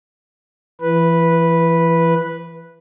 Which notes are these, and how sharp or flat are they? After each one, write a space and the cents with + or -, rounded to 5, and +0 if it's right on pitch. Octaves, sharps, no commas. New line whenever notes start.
E3 +30 B4 -5